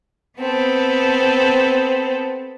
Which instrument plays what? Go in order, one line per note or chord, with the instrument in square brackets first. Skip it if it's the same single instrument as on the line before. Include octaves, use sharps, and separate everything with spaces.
[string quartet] B3 C4 A4